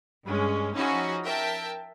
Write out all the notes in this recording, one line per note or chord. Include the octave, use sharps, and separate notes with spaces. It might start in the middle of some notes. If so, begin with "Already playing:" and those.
G2 G#3 C#4
F3 C#4 D#4 E4 F#4 G#4
A#4 E5 G5 A5